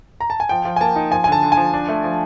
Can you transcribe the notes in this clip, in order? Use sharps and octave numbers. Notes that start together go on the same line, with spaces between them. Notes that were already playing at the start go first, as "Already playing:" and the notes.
A#5
A5
G#5
F3 G5
F3
G#5
A#3 A5
D#4
F3 G#5
G#5
D3 A5
D3
G#5
F3
D4
A3
F3